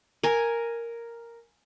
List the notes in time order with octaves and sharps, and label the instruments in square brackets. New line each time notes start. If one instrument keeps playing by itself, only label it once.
[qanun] A#4 G#5